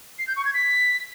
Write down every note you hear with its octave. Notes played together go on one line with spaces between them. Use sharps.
C7
G6
C#6
G#6
B6